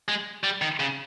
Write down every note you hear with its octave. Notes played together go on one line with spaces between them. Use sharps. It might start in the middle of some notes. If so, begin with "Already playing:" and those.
G#3
G3
D#3
C#3